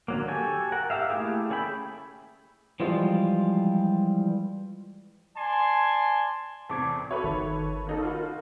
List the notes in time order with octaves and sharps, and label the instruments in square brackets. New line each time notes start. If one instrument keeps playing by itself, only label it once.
[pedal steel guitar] D3 F#3 A#3
F#4 G4 A4 G#5
A#4 F#5
G4 A#4 E5 F5
A3 A#3 E4 G4 G#4
C#4 G#4 A4 G5 B5
[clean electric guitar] E3 F3 G3 G#3 F4
[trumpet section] D5 G#5 A5 C6
[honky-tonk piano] E2 A2 C3 [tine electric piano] A5 D6 G#6
[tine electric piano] F#4 E5 [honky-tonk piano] A4 B4 C#5
[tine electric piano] G1 D#3
[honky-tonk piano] A#3 D#4 A4
[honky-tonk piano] F4 F#4 [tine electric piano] A#4 B5